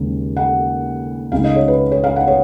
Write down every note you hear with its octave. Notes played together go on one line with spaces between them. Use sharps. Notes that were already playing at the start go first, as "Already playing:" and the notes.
Already playing: D#2 C#3 G#3
F#5
C#2 C#3 G#3 D#4 F5
D#5
C#5
B4
C#5
F5
F#5
C#5